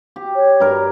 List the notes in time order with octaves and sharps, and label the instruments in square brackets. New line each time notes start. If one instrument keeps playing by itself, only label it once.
[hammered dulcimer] G4
[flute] C#5
[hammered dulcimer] G2 A#4